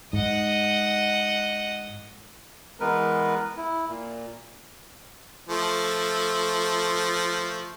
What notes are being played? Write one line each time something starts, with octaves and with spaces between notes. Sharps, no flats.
G#2 D#5 F#5
E3 G#3 B3 A#4 B4
E4
A#2
F3 A3